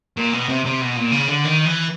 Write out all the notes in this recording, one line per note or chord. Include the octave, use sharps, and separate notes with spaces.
A#2
B2
C3
C3
B2
A#2
C#3
D3
D#3
E3